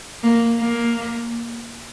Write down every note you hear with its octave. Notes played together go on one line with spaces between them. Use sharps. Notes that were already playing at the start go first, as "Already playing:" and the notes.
A#3
A#3